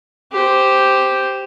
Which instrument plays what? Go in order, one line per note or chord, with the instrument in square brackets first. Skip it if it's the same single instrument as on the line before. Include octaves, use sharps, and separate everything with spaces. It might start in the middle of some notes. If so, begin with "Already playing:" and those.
[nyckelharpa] G4 C5